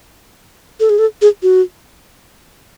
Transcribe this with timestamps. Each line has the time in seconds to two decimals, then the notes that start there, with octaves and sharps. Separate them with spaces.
0.80 A4
0.90 G#4
0.99 A4
1.22 G#4
1.43 F#4